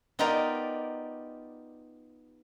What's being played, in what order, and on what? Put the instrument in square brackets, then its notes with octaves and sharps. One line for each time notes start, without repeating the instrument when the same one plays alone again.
[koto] B3 D#4 F4 G4 A#4 D5